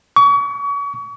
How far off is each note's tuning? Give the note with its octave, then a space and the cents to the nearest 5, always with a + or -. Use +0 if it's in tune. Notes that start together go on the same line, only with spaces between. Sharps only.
C#6 +35